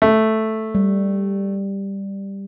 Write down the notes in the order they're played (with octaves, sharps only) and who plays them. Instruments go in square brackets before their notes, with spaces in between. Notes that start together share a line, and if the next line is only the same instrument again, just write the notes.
[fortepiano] A3
[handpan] G3